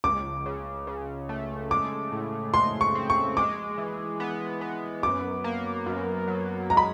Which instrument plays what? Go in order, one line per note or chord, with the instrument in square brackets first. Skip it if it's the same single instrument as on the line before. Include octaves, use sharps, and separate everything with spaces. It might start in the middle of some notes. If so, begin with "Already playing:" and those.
[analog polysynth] C#2 [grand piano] D6
[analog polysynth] C#3
C#3
A3
[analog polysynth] G#3 [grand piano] D6
[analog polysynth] A2
[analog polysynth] G#3 [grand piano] C6
[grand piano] C#6
[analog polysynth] C4
[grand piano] C#6
[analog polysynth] G#3 [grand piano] D6
[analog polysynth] E3
B3
B3
[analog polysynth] F#2 [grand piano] D6
[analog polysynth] A#3
F#2
F#3
[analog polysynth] G#3 [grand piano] A#5
[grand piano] B5